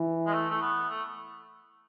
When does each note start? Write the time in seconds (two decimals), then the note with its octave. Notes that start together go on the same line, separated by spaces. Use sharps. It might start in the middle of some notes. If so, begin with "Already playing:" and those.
Already playing: E3
0.26 G#3
0.33 A3
0.50 A3
0.61 B3
0.89 A3